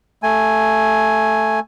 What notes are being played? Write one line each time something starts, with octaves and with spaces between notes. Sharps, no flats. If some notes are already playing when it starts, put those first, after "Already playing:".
A3 G#5